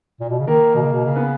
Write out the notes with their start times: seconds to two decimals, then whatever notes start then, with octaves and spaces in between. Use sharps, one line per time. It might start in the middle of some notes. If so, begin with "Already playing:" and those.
0.21 A#2
0.30 B2
0.39 C#3
0.47 D#3 A#3 A#4
0.75 B2
0.81 C#3
0.93 B2
1.05 C#3
1.16 B3 B4